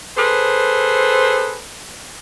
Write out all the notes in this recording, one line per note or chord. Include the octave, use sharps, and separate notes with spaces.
G#4 A4 B4 C5